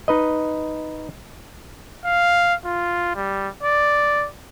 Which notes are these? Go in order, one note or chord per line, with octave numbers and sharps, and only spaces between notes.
D#4 B4 D#5
F5
F4
G3
D5